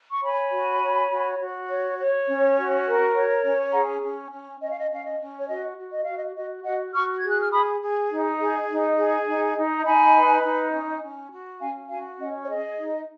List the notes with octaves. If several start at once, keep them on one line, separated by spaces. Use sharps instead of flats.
C#6
C#5 G#5 B5
F#4
C#5
F#4
F#4
C#5
C#5
C#4
F#4
A#4
C#5
C#4
G#4 F#5 A#5
C#4
C#4
C#4 D#5
F5
D#5
C#4 F5
D#5
C#4
C#5
F#4 D#5
F#4
D#5
F#4 F5
D#5
F#4 D#5
F#4 D#5 F#5
F#4 C#6 F6
G#6
G#4
F#6
F6
G#4 B5 D#6
G#4
D#4
G#4
D#4
G#4
D#4
D#4
A#5
D#4 G#5 B5
B4
D#4
C#4
C#4
F#4
C#4 F5 G#5
F#4 F5 G#5
C#4 D#5 F#5
C#5
G#4 D#5
D#4